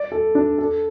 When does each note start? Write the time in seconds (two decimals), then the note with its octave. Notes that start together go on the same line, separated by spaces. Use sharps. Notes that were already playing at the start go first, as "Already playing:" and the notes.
Already playing: D5
0.12 A4
0.35 D4
0.58 A4